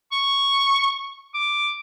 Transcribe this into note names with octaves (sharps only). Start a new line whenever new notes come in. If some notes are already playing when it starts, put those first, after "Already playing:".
C#6
D6